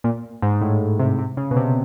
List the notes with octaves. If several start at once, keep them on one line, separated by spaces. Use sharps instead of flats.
A#2
G#2
A2
C3
C3
C#3
B2
C3